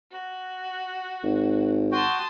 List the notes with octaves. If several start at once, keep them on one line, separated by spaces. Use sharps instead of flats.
F#4
G#1
F#4 G5 A5 C6 D#6